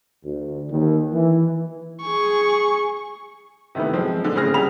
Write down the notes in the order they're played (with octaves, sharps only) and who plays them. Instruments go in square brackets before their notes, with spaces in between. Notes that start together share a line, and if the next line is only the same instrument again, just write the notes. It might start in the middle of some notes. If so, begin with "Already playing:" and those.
[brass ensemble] D2
D#2
E3
[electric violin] G#4 C#6
[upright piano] C3 D#3 E3 A3 B3
F3 F#3 G#3 C4
A#2 D3
A2 C#3 C4 G#4 F6 A#6
C#2 G3 G#4 B5 F7